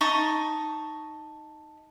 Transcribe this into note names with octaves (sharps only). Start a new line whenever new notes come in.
D#4 D#5 A5 C#6